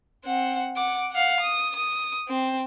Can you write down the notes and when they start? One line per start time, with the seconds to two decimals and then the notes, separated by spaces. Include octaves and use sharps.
0.25 C4 F#5
0.76 F#5 D6
1.12 F5 F#5
1.41 D#6
1.76 D#6
2.28 C4